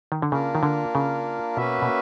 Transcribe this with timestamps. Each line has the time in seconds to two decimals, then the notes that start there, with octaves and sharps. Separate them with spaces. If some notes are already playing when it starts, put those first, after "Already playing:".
0.12 D#3
0.22 D3
0.32 C#3 A#3 D4 F4 A#4
0.55 D#3
0.63 D3
0.95 C#3
1.57 B2 A#3 C#4 F#4 B4 E5
1.82 B2